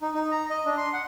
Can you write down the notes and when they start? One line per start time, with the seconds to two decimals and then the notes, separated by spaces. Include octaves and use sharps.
0.02 D#4
0.14 D#4
0.31 A#5
0.50 D#5
0.66 D4
0.77 C6
0.93 F#5